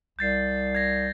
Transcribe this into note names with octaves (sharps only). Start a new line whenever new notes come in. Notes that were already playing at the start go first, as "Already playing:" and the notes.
C2 G6 A6 C7
G#6 A#6